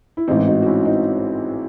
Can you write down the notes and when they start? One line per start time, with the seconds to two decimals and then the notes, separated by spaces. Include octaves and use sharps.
0.17 E4
0.28 A1 G#2 E3 C4 D#4
0.47 D#4 F#4
0.62 F#4
0.66 C#4 E4
0.85 C4 D#4